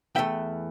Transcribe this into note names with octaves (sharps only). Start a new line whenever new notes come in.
E2 E3 A3 E5 G5